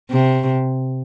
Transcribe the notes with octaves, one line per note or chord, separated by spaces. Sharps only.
C3